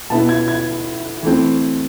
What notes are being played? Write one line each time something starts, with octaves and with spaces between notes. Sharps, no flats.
B2 B3 E4 A5
G#6
G#6
E3 A3 C4